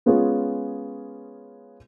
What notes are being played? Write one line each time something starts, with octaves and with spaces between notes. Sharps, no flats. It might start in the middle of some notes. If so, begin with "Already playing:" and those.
G#3 B3 C#4 F4 G#4